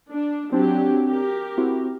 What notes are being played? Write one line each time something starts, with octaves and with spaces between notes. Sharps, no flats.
D4
F#3 C4 D4 G4
G4 A#4
C4 E4 F#4